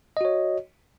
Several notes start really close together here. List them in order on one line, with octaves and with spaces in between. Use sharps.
D#5 F#4 C#5